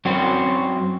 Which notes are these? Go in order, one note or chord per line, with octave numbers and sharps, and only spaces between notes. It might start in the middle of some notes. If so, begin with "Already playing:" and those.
F#2 F#3 C4 F#4